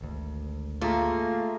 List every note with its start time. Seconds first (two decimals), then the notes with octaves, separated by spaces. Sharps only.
0.01 G#1 D2
0.81 A3 A#3 F4 G#4 A#5